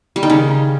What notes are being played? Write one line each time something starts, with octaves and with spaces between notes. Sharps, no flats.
G3
D#3
C#3